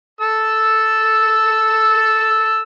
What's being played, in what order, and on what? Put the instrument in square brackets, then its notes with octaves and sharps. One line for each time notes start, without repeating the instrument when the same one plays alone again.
[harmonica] A4 E6